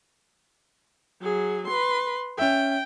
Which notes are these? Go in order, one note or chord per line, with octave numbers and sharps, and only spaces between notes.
F#3 G#4
B4 C6
C#4 E5 G5